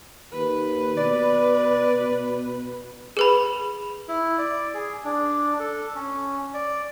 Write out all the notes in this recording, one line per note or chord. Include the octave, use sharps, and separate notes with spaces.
D#2 B4
B2 D5
G#4 B4 B5
E4
D5
G#4
D4
A4
C#4
D5